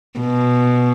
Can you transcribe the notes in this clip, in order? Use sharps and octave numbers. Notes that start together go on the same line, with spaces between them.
B2